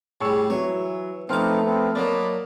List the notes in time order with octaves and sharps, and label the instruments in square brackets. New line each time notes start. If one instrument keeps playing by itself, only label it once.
[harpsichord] A2 G3 [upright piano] G#4 C#6 E6
[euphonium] E3 [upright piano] F#3 [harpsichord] C#5
[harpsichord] F3 D6 [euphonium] A3 [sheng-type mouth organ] B3 C4 D#4 [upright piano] C6 F6
[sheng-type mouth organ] B3 C4
[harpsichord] F#3 D4 [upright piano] A#3 D5 [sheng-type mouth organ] D#5 B5 D6